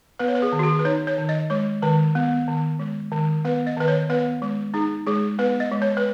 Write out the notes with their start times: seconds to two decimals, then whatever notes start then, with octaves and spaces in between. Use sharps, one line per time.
0.19 B3 B4
0.28 C#5
0.35 B4
0.42 G#4
0.52 D#3
0.59 F#4
0.63 G#4
0.79 B4
0.85 D#4 C#5
1.07 C#5
1.18 D#3
1.29 D#5
1.50 G#3 C#5
1.82 D#3 B4
2.15 B3
2.48 D#3
2.79 G#3
3.11 D#3
3.45 B3 B4
3.67 D#5
3.77 D#3 B4
3.88 C#5
4.10 B3 B4
4.42 G#3
4.74 D#4 G#4
5.07 G#3 G#4
5.39 B3 B4
5.60 D#5
5.72 G#3
5.82 C#5
5.97 B4